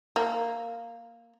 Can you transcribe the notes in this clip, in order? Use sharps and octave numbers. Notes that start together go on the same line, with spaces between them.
A#3